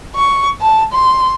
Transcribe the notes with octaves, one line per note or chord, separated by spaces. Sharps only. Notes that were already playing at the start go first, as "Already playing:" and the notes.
C#6
A5
C6